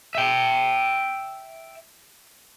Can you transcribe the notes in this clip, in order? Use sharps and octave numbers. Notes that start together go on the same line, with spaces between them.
E5 G5